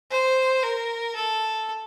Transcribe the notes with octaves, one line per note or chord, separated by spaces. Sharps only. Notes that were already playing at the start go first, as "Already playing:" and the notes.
C5
A#4
A4